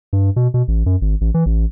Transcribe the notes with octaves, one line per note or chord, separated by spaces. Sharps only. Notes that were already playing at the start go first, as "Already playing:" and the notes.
G2
B2
B2
A1
F#2
G#1
A1
E3
A1